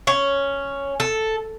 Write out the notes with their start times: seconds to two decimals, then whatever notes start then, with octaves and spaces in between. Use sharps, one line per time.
0.07 C#4
1.00 A4